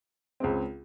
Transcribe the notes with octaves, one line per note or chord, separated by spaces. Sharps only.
C#2 C#3 G#3 C4